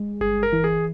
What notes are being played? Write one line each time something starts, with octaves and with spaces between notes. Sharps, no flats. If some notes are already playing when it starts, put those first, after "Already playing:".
Already playing: G#3
G1 G#4
A#4
E3
G#4